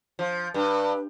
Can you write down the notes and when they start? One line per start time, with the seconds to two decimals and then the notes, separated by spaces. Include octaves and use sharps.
0.19 F3
0.54 G2 B4